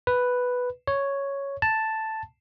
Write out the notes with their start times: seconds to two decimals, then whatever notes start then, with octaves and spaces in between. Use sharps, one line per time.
0.07 B4
0.87 C#5
1.62 A5